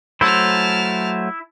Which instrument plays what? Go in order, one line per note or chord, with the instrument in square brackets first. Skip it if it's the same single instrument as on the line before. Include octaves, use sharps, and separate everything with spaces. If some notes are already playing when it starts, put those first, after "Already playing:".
[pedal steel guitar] F#3 A3 C5 [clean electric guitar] E4 [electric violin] A5 F6